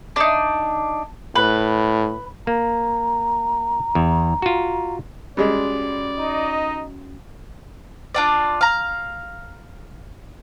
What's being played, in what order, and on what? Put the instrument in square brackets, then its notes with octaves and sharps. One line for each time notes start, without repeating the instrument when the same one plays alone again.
[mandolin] D4 D#4
[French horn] A2 [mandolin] B4
[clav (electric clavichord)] A#3 [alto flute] A#5
[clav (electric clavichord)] E2
F4 F#4
[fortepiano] G3 G#3 [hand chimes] C#4 F#4 [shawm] D5
[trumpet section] D#4 D#5
[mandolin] D4 F4 D5
F5 A#5